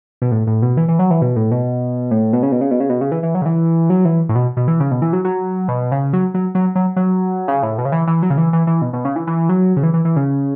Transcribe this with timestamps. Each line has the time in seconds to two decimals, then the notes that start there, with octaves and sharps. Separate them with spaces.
0.22 B2
0.31 A2
0.47 A2
0.62 B2
0.77 E3
0.88 E3
0.99 F#3
1.11 E3
1.22 B2
1.36 A2
1.51 B2
2.11 A2
2.33 B2
2.43 C#3
2.52 B2
2.61 C#3
2.71 B2
2.80 C#3
2.89 B2
3.01 C#3
3.12 E3
3.23 E3
3.35 F#3
3.42 C#3
3.46 E3
3.90 F#3
4.05 E3
4.29 A2
4.35 B2
4.57 B2
4.68 E3
4.80 C#3
4.91 B2
5.02 E3
5.13 F#3
5.25 F#3
5.68 B2
5.92 C#3
6.13 F#3
6.34 F#3
6.55 F#3
6.75 F#3
6.96 F#3
7.48 C#3
7.63 A2
7.78 B2
7.85 C#3
7.92 E3
8.07 E3
8.23 F#3
8.30 C#3
8.38 E3
8.53 E3
8.67 E3
8.82 B2
8.93 B2
9.05 C#3
9.16 E3
9.27 E3
9.49 F#3
9.76 C#3
9.83 E3
9.94 E3
10.05 E3
10.16 C#3